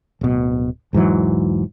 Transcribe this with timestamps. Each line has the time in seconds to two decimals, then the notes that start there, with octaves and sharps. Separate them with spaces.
0.21 D1 B2
0.93 E1 G#2 E3 F#3